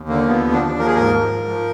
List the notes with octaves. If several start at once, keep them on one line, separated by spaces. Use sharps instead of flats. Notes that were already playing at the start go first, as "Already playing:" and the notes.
Already playing: D#2
D3 A#3
F3 B3
D#2
D4
D#2
F3 A#4
G#4
G#2 A#4
F3
G#2
F3